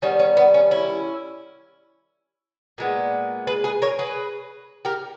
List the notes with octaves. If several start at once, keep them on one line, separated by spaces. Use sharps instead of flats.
D#3 G3 B3 C#4
C#4
B3
C#4
C#4 E4
A#2 G#3 B3
G#4 B4
G#4 B4
A#4 C#5
G#4 B4
G4 A#4